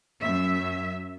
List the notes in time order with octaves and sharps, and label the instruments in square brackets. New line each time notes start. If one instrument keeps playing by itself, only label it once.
[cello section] F#2 E5